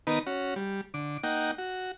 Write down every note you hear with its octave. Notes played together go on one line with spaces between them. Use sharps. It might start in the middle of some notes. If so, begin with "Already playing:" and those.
D#3 B3 D#4 A#4 B4
C#4 F#4
G3
D3 D6
A#3 D#4 F#5 G5
F#4